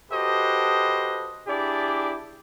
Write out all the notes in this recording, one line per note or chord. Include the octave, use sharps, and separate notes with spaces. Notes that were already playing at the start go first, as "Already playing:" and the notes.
F#4 G4 A4 B4 C5 D#5
D4 E4 G4 G#4 D5